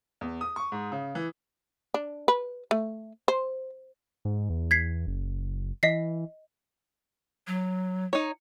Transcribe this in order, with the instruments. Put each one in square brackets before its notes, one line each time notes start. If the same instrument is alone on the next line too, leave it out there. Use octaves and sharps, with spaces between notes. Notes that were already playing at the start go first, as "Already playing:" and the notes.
[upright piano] E2
D#6
C#6
G#2
C#3
E3
[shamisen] D4
B4
A3
C5
[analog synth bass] G#2
E2
[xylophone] G#6 B6 C7
[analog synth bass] F#1
[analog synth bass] E3 [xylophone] D#5 B6 C7
[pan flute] F#3
[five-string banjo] D#4 C#5